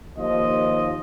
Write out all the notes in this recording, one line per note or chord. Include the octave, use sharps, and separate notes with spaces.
D#2 F3 D#5